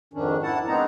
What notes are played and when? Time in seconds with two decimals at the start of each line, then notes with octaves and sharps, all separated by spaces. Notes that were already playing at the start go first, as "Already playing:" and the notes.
0.14 F2 G#2 D#3 C#4 D4
0.43 E4 F#5 A5
0.67 G#3 B3 C4 D4 D#4 A#5